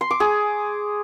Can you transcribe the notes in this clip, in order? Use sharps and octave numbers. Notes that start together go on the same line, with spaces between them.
C6
D6
G#4